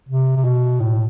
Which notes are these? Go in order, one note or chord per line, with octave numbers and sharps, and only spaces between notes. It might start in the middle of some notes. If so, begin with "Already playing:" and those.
C3
C3
B2
A2